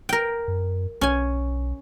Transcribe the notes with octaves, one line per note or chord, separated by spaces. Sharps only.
A#4 G5
F#2
B1 C#4 G#5